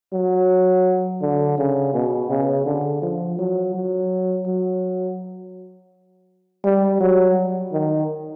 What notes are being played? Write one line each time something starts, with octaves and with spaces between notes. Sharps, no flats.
F#3
D3
C#3
B2
C#3
D3
F3
F#3
F#3
F#3
G3
F#3
D#3